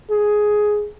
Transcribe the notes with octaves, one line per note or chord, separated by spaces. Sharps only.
G#4